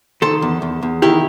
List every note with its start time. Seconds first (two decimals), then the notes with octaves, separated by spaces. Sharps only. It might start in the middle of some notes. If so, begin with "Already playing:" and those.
0.22 D#3 A4 C5
0.42 E2
0.62 E2
0.82 E2
1.02 D#3 E4 G4